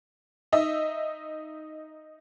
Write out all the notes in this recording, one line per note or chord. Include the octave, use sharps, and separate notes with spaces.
D#4 D#5 E5